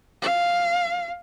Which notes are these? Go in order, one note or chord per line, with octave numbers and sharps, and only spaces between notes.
F5